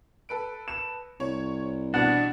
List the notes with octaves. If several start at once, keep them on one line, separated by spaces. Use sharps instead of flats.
A4 B4 D7
E7
C2 C#5
B2 E3 D4 F#5